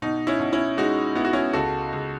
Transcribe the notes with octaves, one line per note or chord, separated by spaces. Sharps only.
B2 D#4
C#4 E4
B2
C#4 E4
G#3 D#4 F#4
B3 E4
F#4
C#4 E4
C#2 F#4 A4
C#2